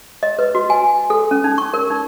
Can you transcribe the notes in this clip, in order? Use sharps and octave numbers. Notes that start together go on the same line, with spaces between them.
D#5
B4
F#4
G#5
A4
C#4
D#4
C#6
A#4
D#4